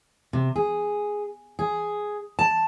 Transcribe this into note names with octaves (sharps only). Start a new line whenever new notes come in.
C3
G#4
G#4
A5